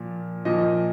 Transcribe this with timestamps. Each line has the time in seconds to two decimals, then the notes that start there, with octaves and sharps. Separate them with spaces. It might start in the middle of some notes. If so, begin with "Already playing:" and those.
Already playing: A#2 F3
0.45 A#2 F3 D#5